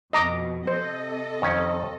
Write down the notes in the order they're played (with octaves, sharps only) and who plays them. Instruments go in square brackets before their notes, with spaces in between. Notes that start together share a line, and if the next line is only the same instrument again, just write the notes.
[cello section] F2 B2 [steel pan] D#5 A#5 D6
[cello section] C3 A4 D#5 [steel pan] C5
[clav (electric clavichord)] F2 D#3 C#4